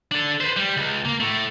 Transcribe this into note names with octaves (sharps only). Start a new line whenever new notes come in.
D4 A4
B4 C5
G3
C#2
A#3
A2 A3